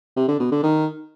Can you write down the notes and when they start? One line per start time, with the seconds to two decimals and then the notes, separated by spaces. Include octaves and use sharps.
0.17 C3
0.28 D3
0.40 B2
0.52 D3
0.63 D#3